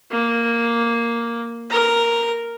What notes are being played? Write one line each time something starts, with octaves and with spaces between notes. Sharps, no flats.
A#3
A#4 A#5